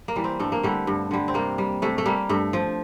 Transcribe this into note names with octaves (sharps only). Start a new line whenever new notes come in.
A#3
E3 G3
C4
G2 A3
A#3
D3 G3 A3
G2
D3 G3
C4
C3 A#3
G3
C3 A3
A3
G3 A#3
G2 A3
F3